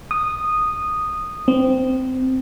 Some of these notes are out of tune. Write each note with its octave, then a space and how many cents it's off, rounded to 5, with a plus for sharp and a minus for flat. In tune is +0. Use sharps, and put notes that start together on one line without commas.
D#6 -10
C4 -15